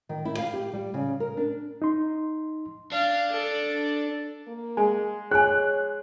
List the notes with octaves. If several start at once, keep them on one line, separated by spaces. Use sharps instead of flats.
D#3
E4
F5
G4
G3
C#3
A#4
D4
D#4 C6
D4 F5
A4 D5
A#3
G#3 G#5
G#4 C#5 G#5 F#6